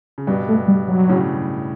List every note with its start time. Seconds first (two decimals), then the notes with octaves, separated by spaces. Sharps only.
0.18 C#3
0.27 G2 B2 G3
0.49 A3
0.68 G3
0.88 F#3
1.09 A2 C#3